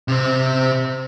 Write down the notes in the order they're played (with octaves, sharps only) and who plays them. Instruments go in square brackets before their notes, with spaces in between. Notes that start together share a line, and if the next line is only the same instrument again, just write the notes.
[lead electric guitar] C3 C5